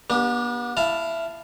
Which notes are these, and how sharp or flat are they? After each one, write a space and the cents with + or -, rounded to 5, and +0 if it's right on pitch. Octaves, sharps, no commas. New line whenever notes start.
B3 -40 D4 +0 G4 +0
E4 +10 F5 -5 A5 +0